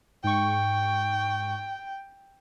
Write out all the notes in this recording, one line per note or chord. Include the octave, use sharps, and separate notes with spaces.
G#2 G5 C#6